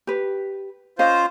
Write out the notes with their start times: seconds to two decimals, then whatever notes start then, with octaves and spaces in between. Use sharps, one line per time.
0.07 G4 B4
0.99 C#4 F4 C5 D#5 F5